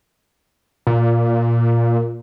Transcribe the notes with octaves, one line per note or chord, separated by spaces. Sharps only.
A#2